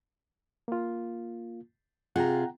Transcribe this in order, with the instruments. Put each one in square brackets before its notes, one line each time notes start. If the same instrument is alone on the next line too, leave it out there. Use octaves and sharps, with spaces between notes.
[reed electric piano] A#3 F4
[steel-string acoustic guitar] C3 F4 G#4 [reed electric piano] F#5 G5 A#5